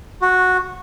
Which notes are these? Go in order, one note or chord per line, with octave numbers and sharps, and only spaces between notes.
F#4